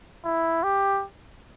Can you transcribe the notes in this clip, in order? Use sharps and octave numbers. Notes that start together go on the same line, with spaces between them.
E4
G4